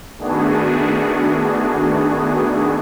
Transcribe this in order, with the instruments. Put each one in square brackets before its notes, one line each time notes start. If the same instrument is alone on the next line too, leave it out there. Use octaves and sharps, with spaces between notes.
[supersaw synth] D#3 A3 B3 D4 F#4 G#4